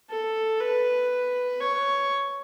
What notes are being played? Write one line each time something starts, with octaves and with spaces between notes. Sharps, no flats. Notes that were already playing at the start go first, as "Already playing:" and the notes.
A4
B4
C#5